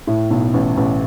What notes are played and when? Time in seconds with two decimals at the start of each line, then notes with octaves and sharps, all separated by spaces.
0.07 A2
0.31 B1
0.54 A1
0.77 A1